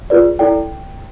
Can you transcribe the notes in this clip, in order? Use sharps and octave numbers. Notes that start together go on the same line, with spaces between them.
F4 G#4 B4 D5
E4 A4 D5 G5